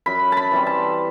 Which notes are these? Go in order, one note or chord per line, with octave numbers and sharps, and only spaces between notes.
F#2 B5
A5 B5
E3 G3 C4
A5